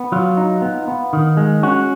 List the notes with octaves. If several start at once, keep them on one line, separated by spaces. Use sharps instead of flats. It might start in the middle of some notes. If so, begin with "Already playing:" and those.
Already playing: B3
F#3 F4
D#4
B3
B3
D#3
G#3
C#4 F#4